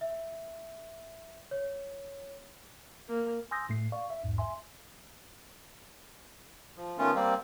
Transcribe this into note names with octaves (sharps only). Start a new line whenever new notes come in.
E5
C#5
A#3
G#5 C6 D#6 E6 G6 A#6
A2 A3 C7
D5 F5 C#6
E5
B1 E2 G#2
E5 G#5 C6
F3
D#3 A3 B3 C#4 F4
G3 A#3 C4